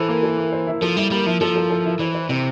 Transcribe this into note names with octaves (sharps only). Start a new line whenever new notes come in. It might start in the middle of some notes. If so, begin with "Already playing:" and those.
Already playing: E3 E4 A4 C5
A#3
A4
A#3
C5
E4
F3 A4
G3 E4
G3 A#3
F3 E4
F3 A4
A4
A4
E4
E3 C5
C5
C3 C5